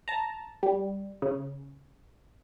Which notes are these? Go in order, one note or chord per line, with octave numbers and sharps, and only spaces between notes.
A5 A#5
G3
C#3